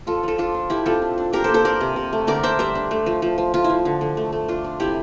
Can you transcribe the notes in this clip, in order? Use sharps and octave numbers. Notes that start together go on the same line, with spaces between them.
F3 F4 A4
F3 F4 A4
D4 F4 A4
D4
F3 E4 G4
C4 F4 A4
D4
D4
D4 G4 A#4
A#3 A4 C5
A4 C5
D4 A#4 D5
C3
C3
A3
D3 A#4 D5
D4 C5 E5
G3 C5 E5
D4
A3
F3
F3
F3
F3 F4
E4
F3
D3
D3
A3
A3
D4 F4
D4
C3 E4 G4